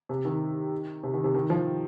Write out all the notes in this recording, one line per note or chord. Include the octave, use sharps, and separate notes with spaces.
C3
D#3
C3
D#3
C3
D#3
F3